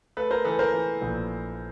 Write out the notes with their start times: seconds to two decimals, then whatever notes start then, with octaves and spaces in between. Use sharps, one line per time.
0.17 A3 A4 B4
0.31 A#4 C5
0.45 E3 A4 B4
0.59 A#4 C5
0.73 E3
1.02 A#1